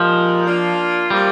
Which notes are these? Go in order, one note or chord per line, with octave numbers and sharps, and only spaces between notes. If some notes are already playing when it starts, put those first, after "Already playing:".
Already playing: A#2 F3 G#3 D#4 G4 A#4
A#3 D4 F4
C3 F3 G3 A#3